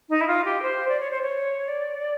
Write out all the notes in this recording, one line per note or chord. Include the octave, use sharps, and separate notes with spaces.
D#4
E4
F4
G4
C5
D5
C#5
C5
C#5
D5